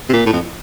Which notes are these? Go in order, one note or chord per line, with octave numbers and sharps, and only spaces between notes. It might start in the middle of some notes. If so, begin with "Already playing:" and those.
C3
A#2
A2
F2